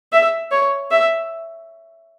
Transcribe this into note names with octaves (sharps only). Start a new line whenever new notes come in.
E5
C#5
E5